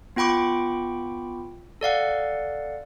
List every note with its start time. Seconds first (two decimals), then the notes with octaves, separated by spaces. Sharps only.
0.16 B3 F4 G5 B5 C#6 D6
1.81 A4 D5 F5 F#5